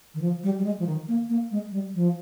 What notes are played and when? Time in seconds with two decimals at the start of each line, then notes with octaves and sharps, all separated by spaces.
0.14 D#3
0.21 F3
0.43 G3
0.59 G3
0.64 G#3
0.80 F3
0.86 D#3
1.08 A#3
1.29 A#3
1.51 G#3
1.72 G3
1.94 F3